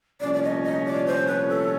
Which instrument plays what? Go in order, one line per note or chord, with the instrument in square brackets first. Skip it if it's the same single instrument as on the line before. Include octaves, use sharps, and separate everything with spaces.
[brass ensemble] C2 A#2 F3 A3 C#4 [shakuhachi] D5
[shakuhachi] D5
D#5
D#5
D5
C5
B4
A4